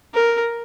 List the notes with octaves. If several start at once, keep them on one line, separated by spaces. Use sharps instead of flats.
A#4